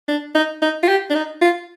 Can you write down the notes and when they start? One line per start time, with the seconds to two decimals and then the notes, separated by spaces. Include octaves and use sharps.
0.08 D4
0.35 D#4
0.62 D#4
0.83 F4
0.88 G4
1.10 D4
1.15 D#4
1.42 F4